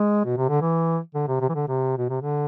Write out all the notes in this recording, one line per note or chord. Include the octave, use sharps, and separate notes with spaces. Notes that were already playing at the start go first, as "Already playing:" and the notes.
Already playing: G#3
B2
C3
D3
E3
D3
C3
C3
E3
D3
C3
B2
C3
D3